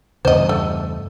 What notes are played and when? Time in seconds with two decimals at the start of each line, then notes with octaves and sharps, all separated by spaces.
0.25 E2 G2 C#3 C5 D#5
0.49 A3